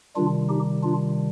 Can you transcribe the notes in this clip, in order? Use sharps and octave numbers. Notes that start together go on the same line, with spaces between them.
C3 D#3 G3 D4 F4
D#4 G4
D4 F4